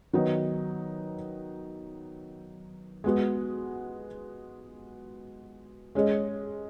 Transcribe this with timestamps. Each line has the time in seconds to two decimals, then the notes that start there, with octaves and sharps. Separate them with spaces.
0.13 D#3 F#3 B3 D#4
3.04 G#3 B3 F#4
5.95 G#3 C#4 G#4 D#5